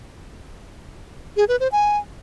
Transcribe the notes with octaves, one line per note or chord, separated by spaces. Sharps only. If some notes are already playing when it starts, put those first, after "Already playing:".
G#4
B4
C5
G#5